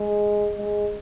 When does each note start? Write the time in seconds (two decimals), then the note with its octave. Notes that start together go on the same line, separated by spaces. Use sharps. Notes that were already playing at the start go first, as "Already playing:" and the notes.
Already playing: G#3
0.57 G#3